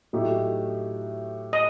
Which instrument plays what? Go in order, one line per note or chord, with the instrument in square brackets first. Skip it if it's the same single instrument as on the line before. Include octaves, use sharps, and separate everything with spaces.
[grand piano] A2 F#3 A3 D#4 G4
[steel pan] D#5